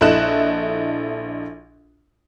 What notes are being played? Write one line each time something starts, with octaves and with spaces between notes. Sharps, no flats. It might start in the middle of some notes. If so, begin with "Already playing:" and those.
A#1 E4 A4 D#5 F#6 E7